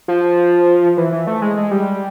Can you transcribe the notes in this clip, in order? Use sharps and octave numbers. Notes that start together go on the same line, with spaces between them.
F3
E3
E3
A3
G#3
G#3
G3